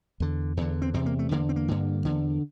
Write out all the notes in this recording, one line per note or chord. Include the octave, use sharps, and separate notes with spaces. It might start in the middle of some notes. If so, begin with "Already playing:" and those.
E2 D3
E2 D3 F3
C4
E2 C3 C4
A#3
A3
E2 D3 A#3
C4
A#3
G2 D3
E2 D3